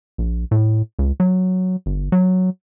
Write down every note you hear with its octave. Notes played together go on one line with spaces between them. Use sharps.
A#1
A2
C#2
F#3
G1
F#3